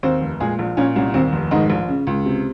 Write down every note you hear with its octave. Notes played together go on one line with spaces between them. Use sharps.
D#2 C4 C5
F1
A#2 G#3 G#4
A#1
A#2 C#4
C2 C#4
D#2 C4
F1
G#2 D#3 D#4
A#1
C#3
C#2
C3